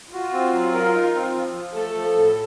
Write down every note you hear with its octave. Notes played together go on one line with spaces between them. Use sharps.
F4 F#4
C4
F#3
A#4
D#4
C4
F3
F3
A3 A4
F3
A2